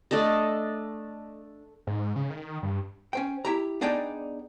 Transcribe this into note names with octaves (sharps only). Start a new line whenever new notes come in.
A3 D4 A4 D#5
G#2
C#3
D#3
G2
C#4 C5 G5
E4 G4 A#5
B3 D4 D#4 G#4 D5 G5